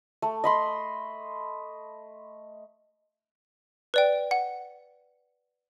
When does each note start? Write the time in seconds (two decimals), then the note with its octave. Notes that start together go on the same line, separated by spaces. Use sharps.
0.22 A3
0.44 D#5 B5 C6
3.94 B4 D5 G5
4.31 F#5